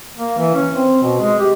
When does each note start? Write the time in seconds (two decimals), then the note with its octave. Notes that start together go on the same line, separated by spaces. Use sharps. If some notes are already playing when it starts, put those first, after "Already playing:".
0.18 A#3
0.38 E3
0.54 C#4
0.73 C4
1.03 B2
1.21 G#3
1.39 G4